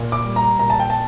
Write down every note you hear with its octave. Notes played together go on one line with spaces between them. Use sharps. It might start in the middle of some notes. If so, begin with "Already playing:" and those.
Already playing: A#2
D6
G3
A#5
A#2 A#5
A5
G5
A5